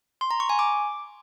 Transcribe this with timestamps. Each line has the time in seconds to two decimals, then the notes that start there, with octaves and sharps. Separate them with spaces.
0.21 C6
0.31 A#5
0.40 C#6
0.49 G#5
0.59 D6